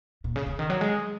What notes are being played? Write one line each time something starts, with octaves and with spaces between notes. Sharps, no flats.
A#2
C#3
C#3
D#3
F#3
G#3